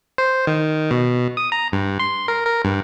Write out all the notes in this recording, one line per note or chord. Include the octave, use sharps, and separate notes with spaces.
C5
D#3
B2
D#6
A#5
G2
C6
A#4
A#4
G2